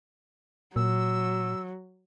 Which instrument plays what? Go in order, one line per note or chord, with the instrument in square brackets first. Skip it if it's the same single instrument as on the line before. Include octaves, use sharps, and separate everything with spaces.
[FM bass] A#2 [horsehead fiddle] F#3 [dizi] E6